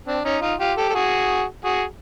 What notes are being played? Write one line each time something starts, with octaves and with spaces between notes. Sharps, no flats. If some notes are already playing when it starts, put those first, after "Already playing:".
C4 D4
C#4 D#4
D#4 F4
F4 G4
G4 A4
A4
F#4 G#4
F#4 G#4